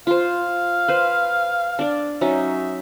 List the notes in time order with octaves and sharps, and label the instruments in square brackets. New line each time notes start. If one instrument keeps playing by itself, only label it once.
[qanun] F4 C5 [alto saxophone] F5
[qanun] B4 C5
D4 D5
[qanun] F#3 C#4 D#4 [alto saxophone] E5